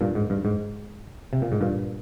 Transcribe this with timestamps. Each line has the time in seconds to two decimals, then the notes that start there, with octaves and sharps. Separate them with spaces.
0.01 G2 A#2
0.15 G#2
0.30 G2
0.45 G#2
1.33 C3
1.42 A#2
1.52 G#2
1.61 G2 A#2